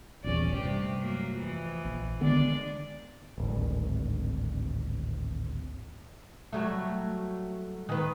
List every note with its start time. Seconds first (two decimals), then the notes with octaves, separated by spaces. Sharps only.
0.24 D#1 A#1 E2 C#4 D5
0.54 G2 C3 A3 G4
1.00 F#3 A#3
1.36 F2 E3
1.85 A#1
2.21 D3 D#3 G#3 B3 D4 D5
3.38 D1 G#1
6.53 F#3 G3 A3
7.89 D#3 B4